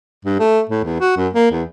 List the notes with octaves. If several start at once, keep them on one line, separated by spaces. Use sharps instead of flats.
G2
A3
A2
E2
F#4
F#2
A#3
E2